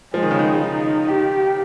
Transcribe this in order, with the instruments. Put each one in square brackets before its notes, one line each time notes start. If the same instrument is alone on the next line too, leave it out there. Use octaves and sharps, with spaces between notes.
[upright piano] F3 [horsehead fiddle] G#3
[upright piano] D#3
C#3
D#3
[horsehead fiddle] D#4
G4